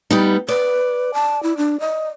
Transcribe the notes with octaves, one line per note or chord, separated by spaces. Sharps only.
G3 B3 D#4
B4 D5
A5
E4
D4
D#5